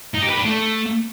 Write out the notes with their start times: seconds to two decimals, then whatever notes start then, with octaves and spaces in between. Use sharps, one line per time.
0.14 D#4
0.22 G4
0.29 B4
0.37 D4
0.45 A3